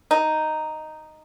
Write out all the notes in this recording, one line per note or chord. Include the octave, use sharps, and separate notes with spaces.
D#4